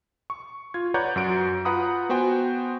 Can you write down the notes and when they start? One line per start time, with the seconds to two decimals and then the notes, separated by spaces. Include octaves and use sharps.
0.30 C#6
0.74 F4 G#6
0.94 B4 C#5 D5 F#5 A#5 G6
1.16 F#2 F#4 D7
1.65 F4 B4 F#5 A#5 B5 D#6
2.09 B3 F#4 C5 G5 G#5